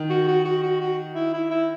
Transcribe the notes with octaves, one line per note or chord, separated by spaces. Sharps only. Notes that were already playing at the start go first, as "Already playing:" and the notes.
Already playing: D#3
F#4
F#4
F#4
F#4
F#4
E4
E4
E4